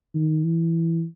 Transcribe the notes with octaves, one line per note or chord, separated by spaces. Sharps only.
D#3
E3